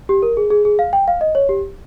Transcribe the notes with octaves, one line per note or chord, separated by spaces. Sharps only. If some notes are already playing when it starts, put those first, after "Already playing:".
G4
A#4
G#4
G#4
G#4
F5
G5
F5
D#5
C#5
G4